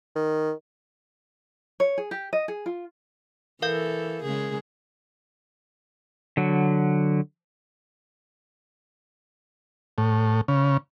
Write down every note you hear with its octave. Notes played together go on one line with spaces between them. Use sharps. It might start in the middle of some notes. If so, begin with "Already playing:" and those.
D#3
C#5
G#4
G4
D#5
G#4
F4
E3 A4 A#4 F5 G6
C#3 G#3 G#4
D3 F#3
A2
C#3